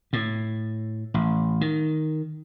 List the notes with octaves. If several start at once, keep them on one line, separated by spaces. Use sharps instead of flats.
A2
A1
D#3